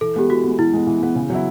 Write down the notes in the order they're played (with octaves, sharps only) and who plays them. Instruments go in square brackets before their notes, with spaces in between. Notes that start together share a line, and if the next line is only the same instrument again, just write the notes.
[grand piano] E3 [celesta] A4
[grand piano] G#3 B3 [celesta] G4
[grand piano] E3 [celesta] F#4
[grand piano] G#3 B3
[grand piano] E3 [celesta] E4
[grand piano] G#3 B3
E3
G#3 B3
C#3
F#3 B3 E4